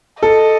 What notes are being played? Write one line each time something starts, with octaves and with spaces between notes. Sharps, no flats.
A4 D#5